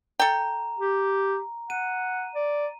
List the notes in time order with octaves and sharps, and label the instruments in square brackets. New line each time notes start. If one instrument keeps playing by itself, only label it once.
[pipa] A4 G5 [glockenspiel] A#5
[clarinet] G4
[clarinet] F#5 [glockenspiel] D#7
[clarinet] D5